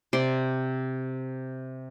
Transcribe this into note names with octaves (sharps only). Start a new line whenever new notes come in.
C3 D5 C6